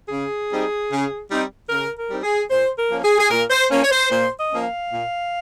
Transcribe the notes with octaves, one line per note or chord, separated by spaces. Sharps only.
C#3 G#4
G3 C4 D#4
C#3
G3 C4 D#4
C#3 A#4
A#4
G3 C4 D#4
G#4
A#2 C5
A#4
F3 A#3 C#4
G#4
G#4
A#2 A#4
C5
F3 A#3 C#4
C#5
C5
A#2 C5
D#5
F3 A#3 C#4
F5
A#2